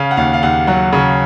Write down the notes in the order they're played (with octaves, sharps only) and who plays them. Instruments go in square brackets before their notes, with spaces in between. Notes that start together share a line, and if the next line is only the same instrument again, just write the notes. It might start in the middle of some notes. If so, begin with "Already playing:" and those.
Already playing: [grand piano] C#3 F5
F#5
D#2 F5
F5
D#2 F#5
F#3 F#5
C#3